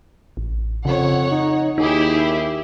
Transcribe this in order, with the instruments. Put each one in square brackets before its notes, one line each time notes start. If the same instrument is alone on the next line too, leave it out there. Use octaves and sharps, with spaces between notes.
[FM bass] A1
[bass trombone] F2 [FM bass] C#3 [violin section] C#5 F#5
[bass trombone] D#4
[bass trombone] D#2 [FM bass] D#4 [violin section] E4 G4 G#4